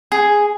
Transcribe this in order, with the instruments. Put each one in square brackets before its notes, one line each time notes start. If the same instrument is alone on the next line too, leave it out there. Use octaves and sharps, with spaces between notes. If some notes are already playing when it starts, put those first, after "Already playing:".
[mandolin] G#4